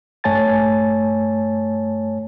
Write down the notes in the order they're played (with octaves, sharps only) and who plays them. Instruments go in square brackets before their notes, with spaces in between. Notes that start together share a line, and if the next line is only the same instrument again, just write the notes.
[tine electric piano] G2 A3 C#5 G#5 A5 A6